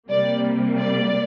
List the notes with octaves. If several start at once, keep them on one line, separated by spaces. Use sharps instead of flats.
C3 G3 A#3 D5
D5